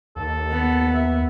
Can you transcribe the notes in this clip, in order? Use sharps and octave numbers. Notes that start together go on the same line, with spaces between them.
D#2 A4
B3
E5